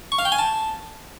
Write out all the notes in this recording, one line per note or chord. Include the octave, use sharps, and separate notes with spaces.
C#6
F5
G5
G#5
A5